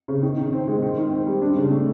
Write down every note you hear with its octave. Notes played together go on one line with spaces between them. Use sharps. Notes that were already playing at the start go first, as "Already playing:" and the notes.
C#3
D#3
D#3
C4
G#3
D#3
D#3
C4
G3
D4
C#3
A3